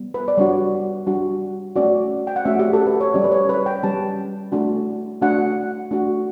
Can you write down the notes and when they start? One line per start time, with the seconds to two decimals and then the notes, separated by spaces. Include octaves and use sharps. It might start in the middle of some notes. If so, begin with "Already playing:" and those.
Already playing: G3 B3
0.14 B4
0.28 D5
0.37 G3 D4 F#4 C#5
1.07 G3 D4 F#4
1.76 A3 C#4 F#4 D5
2.27 G5
2.36 F#5
2.45 A3 C#4 F#4 E5
2.59 G4
2.73 A4
2.86 B4
3.01 C#5
3.14 G3 C#4 G4 D5
3.24 B4
3.32 C#5
3.49 B4
3.66 G5
3.83 G3 C#4 G4 A5
4.52 A3 D4 F#4
5.21 A3 D4 F#4 F#5
5.91 A3 D4 F#4